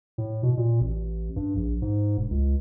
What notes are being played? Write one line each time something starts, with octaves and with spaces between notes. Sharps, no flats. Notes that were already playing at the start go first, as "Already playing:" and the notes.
A2
B2
A#2
A1
G2
A#1
G#2
E1
C#2